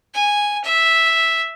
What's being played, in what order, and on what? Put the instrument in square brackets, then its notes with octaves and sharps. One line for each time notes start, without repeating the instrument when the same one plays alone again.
[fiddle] G#5
E5